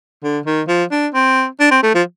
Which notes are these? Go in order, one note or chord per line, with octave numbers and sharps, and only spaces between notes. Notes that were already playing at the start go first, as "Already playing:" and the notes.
D3
D#3
F3
D4
C4
D4
C4
A3
F3